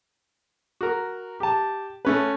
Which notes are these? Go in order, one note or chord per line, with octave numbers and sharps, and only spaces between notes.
F#4 A#4
G4 A5
A3 C#4 B4